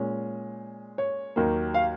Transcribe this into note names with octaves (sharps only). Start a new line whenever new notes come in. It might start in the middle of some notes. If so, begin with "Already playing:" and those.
Already playing: A#2 G#3 C#4
C#5
D#2 D#3 F#3 A#3
F5